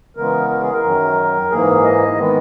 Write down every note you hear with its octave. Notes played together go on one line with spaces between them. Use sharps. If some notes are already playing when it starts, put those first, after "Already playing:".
C#3 E3 G#3 B3 A#4
A#4
G#4
A#4
F#2 D#3 F#3
G#2 E3 A#3 G#4
D#5
D#3 G#3 B3